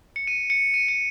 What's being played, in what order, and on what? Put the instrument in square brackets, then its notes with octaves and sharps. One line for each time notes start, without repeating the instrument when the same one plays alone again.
[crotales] C#7
D#7
C#7
D#7
C#7